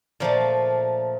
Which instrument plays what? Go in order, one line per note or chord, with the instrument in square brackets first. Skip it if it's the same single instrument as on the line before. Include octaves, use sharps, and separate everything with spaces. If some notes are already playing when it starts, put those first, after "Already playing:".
[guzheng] A#2 F3 A3 A#4